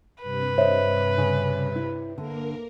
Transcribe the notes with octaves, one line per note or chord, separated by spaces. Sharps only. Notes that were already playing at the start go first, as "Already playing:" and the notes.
G2 C3 B4
C5 C#5 D#5 E5
C#3
E4
D3 A#3 A#4